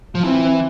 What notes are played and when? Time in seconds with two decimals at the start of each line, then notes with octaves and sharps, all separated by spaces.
0.15 F3
0.24 E3 C4